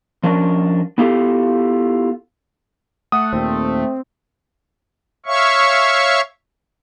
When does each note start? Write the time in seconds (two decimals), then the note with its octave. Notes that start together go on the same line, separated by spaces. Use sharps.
0.23 F3 C#4 D4 A#4
0.98 B3 E4 F4 G4 A4
3.12 A3 F#5 D#6
3.33 D#2 A#2 C4
5.26 C#5 E5 F5 C#6